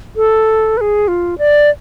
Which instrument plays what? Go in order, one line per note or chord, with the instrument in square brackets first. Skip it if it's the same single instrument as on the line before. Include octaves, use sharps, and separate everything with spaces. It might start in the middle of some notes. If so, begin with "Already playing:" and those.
[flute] A4
B4
G#4
F4
D5